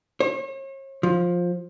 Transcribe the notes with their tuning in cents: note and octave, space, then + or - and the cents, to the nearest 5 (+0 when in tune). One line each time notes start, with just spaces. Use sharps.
C#5 -40
F3 +10